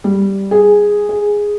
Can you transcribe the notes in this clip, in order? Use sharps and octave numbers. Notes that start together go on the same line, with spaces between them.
G3
G#4
G#4